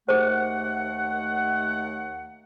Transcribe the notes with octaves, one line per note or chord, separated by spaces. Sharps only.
D#2 A3 G#4 C5 F#5